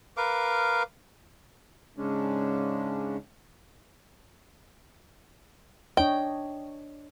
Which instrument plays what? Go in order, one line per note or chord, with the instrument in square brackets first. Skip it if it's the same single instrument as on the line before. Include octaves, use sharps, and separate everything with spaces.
[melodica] A#4 B4 F5 D6
[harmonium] G#2 C#3 G#3 C#4 D4
[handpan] D4 C#5 D#5 [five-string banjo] G5